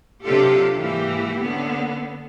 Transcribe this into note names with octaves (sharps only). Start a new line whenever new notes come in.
C3 F#3 D4 F4 G4 A4
G#2 E3 A#3 G4
D3 A#3 B3 C#4